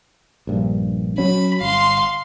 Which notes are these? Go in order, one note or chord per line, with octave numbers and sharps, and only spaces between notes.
A#1 G2
F#3 C#4 B5
G1 F5 C6